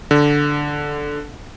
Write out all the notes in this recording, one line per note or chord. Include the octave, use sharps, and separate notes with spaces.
D3